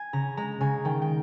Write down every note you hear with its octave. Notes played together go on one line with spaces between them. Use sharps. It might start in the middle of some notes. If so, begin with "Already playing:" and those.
Already playing: G#5
C#3 A#5
G#3 A#5
C#3 G#5
D#3 G5
G5